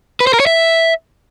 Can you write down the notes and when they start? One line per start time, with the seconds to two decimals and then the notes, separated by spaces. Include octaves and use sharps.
0.20 B4
0.27 C5
0.34 A#4
0.40 C#5
0.47 E5